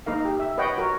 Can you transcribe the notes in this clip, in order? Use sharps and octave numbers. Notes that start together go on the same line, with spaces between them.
A#3 D#4 A#4 F5
G4
E5
B4 C#5 D#5 F#5 G5
F#4 A#4 C#5